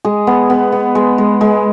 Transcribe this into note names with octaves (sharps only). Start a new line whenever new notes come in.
G#3 G#4
B3
B3
B3
G#3
G#3
G#3